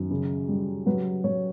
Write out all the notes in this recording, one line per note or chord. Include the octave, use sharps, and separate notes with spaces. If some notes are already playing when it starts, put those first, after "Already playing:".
Already playing: F#2 D#3
C#3
G3
F#3 B4
F#3 C#5